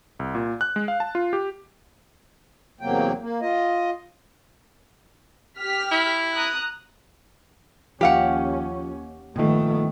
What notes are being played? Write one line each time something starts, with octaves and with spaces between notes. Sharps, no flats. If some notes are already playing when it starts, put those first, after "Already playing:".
C2
A#2
F#6
G#3
F5
A5
F4
G4
E2 C3 F#3 A#3 G5
A#3
F4 D#5
G4 F6 B6
E4
A#5 D#6 F#6
D#2 F3 C#4 G4 F5 F#5
G1 A#2 D#3 F3 A3 B3